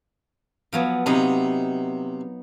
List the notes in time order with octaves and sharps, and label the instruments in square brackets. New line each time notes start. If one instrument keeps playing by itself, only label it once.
[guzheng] F3 F#3 B3
[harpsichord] C3 [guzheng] F#3 B3 D#4